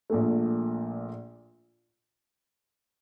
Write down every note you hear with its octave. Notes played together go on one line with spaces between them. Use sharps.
A#1 A#2 A3